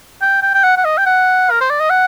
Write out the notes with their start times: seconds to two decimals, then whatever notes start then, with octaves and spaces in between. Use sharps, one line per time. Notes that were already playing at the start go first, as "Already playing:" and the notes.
0.21 G5
0.42 G5
0.54 G5
0.64 F#5
0.77 F#5
0.85 D#5
0.98 G5
1.06 F#5
1.51 A#4
1.61 C5
1.70 D5
1.81 D#5
1.90 F#5